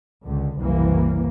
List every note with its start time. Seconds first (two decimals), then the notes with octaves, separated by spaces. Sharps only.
0.25 C#2 D3
0.60 F#1 C2 E3 A#3